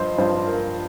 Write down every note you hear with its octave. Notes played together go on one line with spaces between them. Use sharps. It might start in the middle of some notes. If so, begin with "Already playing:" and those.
Already playing: G2 F3 C5 D#5
G2 F3 C5
A#4